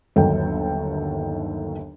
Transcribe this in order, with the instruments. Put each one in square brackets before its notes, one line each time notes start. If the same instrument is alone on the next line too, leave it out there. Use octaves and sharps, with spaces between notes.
[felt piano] G1 D#2 D#3 F#3 A4 G5